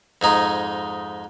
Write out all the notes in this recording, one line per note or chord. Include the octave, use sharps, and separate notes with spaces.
F2 G#2 D#4